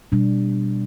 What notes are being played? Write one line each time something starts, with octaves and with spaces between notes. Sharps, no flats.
B2 G3 D4